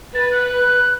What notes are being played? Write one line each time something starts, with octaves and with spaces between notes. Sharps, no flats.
B4 A6
F#6